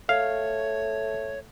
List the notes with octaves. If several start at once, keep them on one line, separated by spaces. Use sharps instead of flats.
A3 C#5 F5